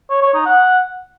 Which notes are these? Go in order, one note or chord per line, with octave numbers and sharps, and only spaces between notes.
C#5
C#5
D#4
F#5